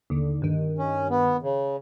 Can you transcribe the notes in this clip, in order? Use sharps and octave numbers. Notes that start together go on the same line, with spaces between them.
D#2 D3
G2 D#3
C#4
B3
C#3